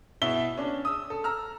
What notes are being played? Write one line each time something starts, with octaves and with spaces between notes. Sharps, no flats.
B2 E4 E5 G7
C#4 D4
D#6 E6
A4
A#5 E6 F6